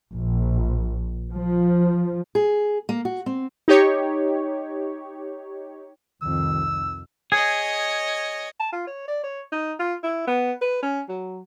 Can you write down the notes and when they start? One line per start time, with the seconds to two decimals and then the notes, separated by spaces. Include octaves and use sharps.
0.14 A#1
1.33 F3
2.35 G#4
2.89 A#3
3.05 F#4
3.26 C4
3.68 D#4 G4 C#5
6.22 C2 F2 D#3 E6
7.32 G#4 C#5 D#5
8.60 A5
8.72 F4
8.87 C#5
9.08 D5
9.24 C#5
9.52 D#4
9.79 F4
10.03 E4
10.27 B3
10.61 B4
10.82 C#4
11.09 F#3